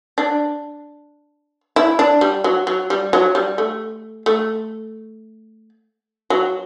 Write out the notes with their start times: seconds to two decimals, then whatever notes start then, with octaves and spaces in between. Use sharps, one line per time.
0.18 D4
1.76 E4
1.99 D4
2.21 G3
2.44 F#3
2.67 F#3
2.90 G3
3.13 F#3
3.35 G3
3.58 A3
4.26 A3
6.30 F#3